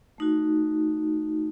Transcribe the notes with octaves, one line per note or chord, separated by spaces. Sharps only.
A3 D#4 F#4